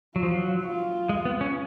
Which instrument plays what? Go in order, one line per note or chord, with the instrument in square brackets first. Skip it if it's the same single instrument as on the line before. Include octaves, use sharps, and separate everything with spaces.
[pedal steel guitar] F#3 [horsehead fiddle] F4
[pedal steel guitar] F3
F#3
[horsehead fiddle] F4
[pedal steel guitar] G#3
B3
C#4